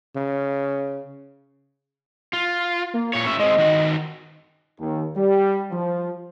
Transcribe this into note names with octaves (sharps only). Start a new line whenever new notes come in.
C#3
F4
A#3
A#2 C#5 C#6
A2 C#4 E5
G#3 C4 D#5
D#3 F#4
D#2
G3
F3